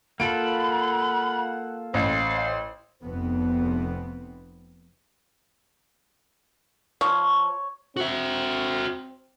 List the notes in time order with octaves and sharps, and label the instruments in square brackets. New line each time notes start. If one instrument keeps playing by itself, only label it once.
[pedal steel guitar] A#3 F4 A4 [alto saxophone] F#5 [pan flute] B5 [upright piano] D7
[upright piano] A1 [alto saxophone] C5 [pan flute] F5
[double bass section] F1 F2 B3 C4
[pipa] F3 [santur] C#5
[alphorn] C4 [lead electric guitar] F#4 E5